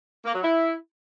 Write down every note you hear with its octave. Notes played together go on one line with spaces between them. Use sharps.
A#3
F#3
E4